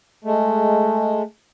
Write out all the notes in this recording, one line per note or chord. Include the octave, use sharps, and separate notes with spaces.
G#3 A3